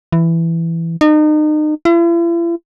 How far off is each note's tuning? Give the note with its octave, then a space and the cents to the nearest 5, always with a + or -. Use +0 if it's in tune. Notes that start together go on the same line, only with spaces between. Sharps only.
E3 +10
D#4 -35
E4 +45